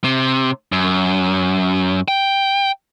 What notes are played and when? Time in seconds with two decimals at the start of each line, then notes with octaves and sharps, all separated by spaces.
0.04 C3
0.72 F#2
2.08 G5